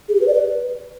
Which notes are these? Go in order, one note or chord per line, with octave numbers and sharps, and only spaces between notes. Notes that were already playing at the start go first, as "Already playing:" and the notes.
G#4
G4
B4
D5
B4